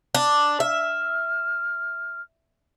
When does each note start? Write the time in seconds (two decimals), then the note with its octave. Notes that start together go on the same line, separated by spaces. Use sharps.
0.15 D4
0.60 E5 F6